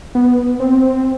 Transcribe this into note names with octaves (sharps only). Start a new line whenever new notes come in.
B3
C4